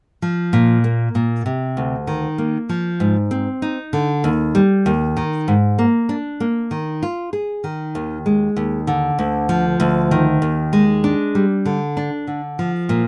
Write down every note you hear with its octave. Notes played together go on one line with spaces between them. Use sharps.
F3
A#2
A#3
A#2
C3
D2
D#3
A#3
F3
G#2
C4
D#4
D3
D#2
G3
D#2
D#3
G#2
A#3
D4
A#3
D#3
F4
G#4
D#3
D#2
G#3
D#2
D3
D2
F3
D2
D#3
D#2
G#3
D4
G3
D3
D4
D3
F3
A#2